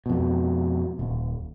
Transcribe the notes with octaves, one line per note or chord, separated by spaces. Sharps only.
F2 B2
D#1 D#2